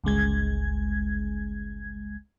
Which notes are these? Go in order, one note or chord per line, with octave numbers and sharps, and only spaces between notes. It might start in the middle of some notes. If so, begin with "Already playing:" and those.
G1 C#2 G#3 G#6